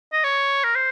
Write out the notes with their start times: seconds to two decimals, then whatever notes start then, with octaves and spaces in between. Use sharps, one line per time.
0.13 D#5
0.24 C#5
0.64 A#4
0.75 C5